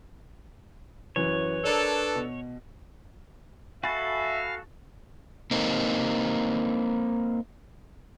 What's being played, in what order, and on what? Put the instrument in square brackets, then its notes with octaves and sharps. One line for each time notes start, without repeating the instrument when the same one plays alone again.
[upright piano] F#2 E3 [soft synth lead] B4 [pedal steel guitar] C#5
[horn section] D4 A4 [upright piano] A#4 D5
[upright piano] B2
[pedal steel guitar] F#4 A4 [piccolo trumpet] E5 [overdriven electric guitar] F5 [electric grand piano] G#5 B5 A6
[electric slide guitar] A#3 C4 D#4